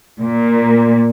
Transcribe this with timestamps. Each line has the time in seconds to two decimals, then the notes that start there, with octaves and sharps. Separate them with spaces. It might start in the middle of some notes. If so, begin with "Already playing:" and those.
0.20 A#2